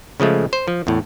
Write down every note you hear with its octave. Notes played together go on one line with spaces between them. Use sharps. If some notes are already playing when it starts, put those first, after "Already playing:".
C#3 F3 G#3 A3
C5
F3
E2 A2